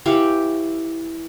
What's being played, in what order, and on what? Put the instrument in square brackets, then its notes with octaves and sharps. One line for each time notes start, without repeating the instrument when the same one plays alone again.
[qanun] E3 G4 F5 C#6